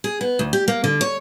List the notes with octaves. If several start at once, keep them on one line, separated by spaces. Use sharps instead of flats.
G#4
B3
D2
G4
A#3
D3
C#5